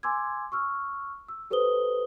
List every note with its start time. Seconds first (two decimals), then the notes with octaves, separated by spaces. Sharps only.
0.03 G#5 C6 D6 E6 G#6
0.52 C#6 E6 F6
1.28 E6
1.51 G4 A4 B4 C5 D#6 G7